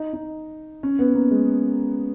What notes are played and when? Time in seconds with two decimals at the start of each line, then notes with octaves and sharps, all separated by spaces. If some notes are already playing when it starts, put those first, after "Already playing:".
Already playing: D#4
0.13 D#4
0.83 C#4
0.99 B3
1.14 A#3
1.31 G#3